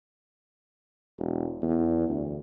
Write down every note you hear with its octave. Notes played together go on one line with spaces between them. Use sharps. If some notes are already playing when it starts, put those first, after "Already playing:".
E1
E2
D2